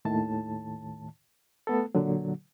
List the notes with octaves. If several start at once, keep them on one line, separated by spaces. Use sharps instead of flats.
D#2 A2 D#3 A5
A3 B3 A4
A#2 D3 F#3